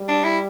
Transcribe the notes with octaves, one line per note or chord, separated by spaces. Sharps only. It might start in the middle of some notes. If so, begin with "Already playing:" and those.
Already playing: G3
D4
E4